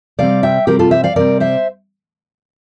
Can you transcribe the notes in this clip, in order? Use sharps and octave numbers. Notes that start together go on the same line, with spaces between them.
C3 G3 C4 D5 F5
E5 G5
C3 G3 C4 G4 A#4
F4 A4
C5 E5
D5 F5
C3 G3 C4 A#4 D5
C5 E5